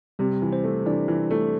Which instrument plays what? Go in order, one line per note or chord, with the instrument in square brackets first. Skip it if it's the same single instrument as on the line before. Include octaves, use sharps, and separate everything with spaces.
[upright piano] C3 [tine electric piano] G3 G4
[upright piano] E3
[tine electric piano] C4 C5
[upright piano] A3
[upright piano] E3 [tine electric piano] D4 D5
[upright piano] E3
A3